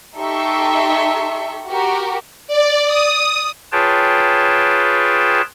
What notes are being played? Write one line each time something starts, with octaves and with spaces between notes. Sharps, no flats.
D#4 G4 A4 E5 C6 C#6
F#4 G4 A#4
D5
D#6
F4 G#4 B4 C#5 G5 A5